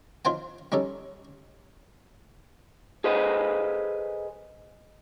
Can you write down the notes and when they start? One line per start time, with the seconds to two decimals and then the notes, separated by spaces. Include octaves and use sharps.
0.25 D#3 F4 C5 G5 G#5
0.72 G3 C#4 D#4 A4
3.04 G#4 A4 B4 C5 D#5